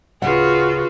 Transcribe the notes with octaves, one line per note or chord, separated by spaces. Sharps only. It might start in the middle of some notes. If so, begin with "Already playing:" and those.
D1 C#3 F4 F#4 G#4 B4 F#5